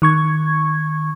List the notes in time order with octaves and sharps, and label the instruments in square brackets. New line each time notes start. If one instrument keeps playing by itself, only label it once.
[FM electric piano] D#3 C#6 G#6